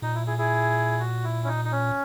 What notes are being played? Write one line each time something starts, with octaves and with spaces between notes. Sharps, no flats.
A#2 D#4
E4
E4 G#4
E4 G#4
F#4
E4
C#4
D#4
D#4
C#4